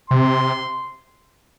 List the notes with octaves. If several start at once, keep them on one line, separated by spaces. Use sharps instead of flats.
C3 C6